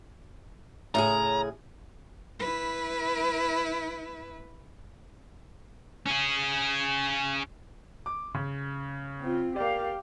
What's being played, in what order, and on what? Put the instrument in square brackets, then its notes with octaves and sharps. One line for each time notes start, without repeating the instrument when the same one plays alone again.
[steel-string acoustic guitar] A2 C#3 G#4 [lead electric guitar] A#5
[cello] E4 B4
[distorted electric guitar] C#4 G#4
[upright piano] D6
C#3
[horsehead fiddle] C4 F4
[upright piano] A#3 D5 [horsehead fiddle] G4 F5